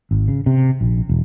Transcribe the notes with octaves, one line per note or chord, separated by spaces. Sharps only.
G#1
C#3
C3
A#1
E1